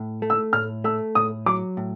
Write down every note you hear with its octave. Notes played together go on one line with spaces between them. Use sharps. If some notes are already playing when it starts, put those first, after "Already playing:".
Already playing: A2
A3
E6
A2 F6
A3 E6
A2 D#6
F#3 D6
A2